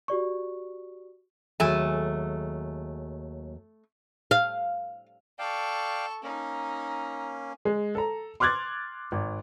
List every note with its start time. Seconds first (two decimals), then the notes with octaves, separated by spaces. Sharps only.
0.08 F#4 G4 D5 C#6
1.60 D#2 F#3 A3 G#4 G#5
4.31 F5
5.39 A4 D5 F5 G5 C#6
6.23 A#3 C#4 D#4
7.65 G#3
7.95 A4 A#5
8.40 C6 D6 F6 F#6 G#6 A6
9.12 G#1